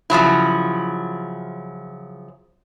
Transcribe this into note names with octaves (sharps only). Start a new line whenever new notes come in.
C#3 F3 F#3 E4